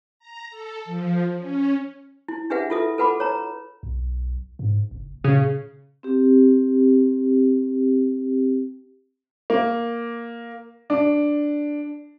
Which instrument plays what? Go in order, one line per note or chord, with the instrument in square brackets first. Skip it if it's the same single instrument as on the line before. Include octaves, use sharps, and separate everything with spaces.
[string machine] A#5
A4
F3
C#4
[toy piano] E4
D4 G4 G#4 B4 E5 F#5
E4 F4 A4 E5 D#6
A4 B4 F#5 B5 D6
C#5 A#5
[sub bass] B1
G#2
F#1
[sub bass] A#2 [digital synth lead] C#3
[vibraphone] C4 G4
[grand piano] A#3
D4